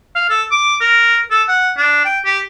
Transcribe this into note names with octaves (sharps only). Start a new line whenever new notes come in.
F5
A4
D6
A#4
A4
F#5
D4
G5
G4